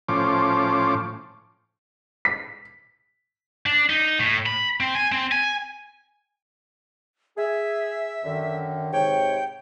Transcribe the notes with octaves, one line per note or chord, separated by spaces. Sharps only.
A2 F3 C#4 C5 D6
B6
D4
D#4
A2
B5
C4
G#5
C4
G#5
G#4 E5
F#2 D3 D#3
G#2 C3 C#5 G5